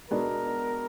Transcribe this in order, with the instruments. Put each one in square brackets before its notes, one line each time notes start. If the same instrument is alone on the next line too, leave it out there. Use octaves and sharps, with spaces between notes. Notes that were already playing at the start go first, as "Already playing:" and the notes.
[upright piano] B2 G#3 B3 D4 F#4 [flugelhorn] A#4